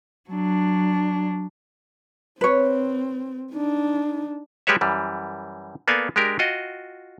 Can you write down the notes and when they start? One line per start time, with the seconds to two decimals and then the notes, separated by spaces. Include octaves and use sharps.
0.30 F#3 D4
2.41 C4 B4 C#5
3.52 D4 D#4
4.67 G3 G#3 G4 B4 C#5 E5
4.81 F#2 E3 G3
5.88 A#3 B3 A4 D5 F5 G#5
6.16 G#3 D4 G4 A#4
6.39 F4 F#4 D#5 G5